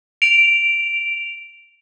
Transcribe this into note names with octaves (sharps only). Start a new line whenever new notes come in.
D7 F7